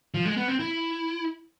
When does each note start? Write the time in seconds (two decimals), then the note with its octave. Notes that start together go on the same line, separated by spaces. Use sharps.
0.14 F3
0.26 G#3
0.37 B3
0.48 C4
0.59 E4